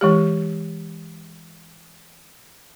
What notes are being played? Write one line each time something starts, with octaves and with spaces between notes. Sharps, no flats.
E3 G#3 G4